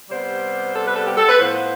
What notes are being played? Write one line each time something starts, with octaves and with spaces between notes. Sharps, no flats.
C3 G3 B3 C5
A4
B4
A4
G4
A4
B4
A2 F3 B3 C5